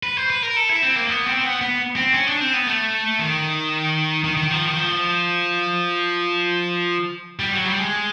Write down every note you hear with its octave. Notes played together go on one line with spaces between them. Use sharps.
B4
C5
B4
A#4
A4
E4
C4
A#3
B3
C4
B3
B3
C4
C#4
D4
C4
B3
A3
D#3
D#3
D#3
F3
D#3
F3
G3
F#3
G3
G#3